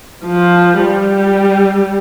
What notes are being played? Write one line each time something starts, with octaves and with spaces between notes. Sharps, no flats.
F3
G3